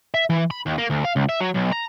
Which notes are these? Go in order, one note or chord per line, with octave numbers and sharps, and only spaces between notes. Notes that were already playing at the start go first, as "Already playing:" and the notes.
E5
E3
B5
D#2
A#3
D2
F5
C#2
E5
F#3
B1
A#5